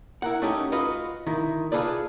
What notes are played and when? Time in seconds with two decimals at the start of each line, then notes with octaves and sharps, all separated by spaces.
0.22 E4 A#4 F#5
0.42 A3 C#4 D#4 G4 A4
0.72 F4 F#4 B4 D#5
1.27 D2 D#3 E4
1.72 F4 G#4 A4 B4 D5